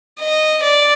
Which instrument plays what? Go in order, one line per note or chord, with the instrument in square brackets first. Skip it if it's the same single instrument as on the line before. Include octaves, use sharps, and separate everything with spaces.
[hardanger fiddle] D#5
D5